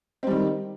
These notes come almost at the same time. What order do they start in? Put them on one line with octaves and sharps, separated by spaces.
C4 G3 D#3